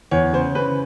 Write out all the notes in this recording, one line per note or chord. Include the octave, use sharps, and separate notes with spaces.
E2 C#5
C#3 C5
C#3 B4